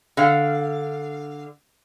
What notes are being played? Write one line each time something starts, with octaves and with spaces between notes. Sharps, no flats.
D3 F5